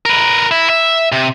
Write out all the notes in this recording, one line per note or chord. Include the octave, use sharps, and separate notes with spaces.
A#4 B4
E4
E5
C3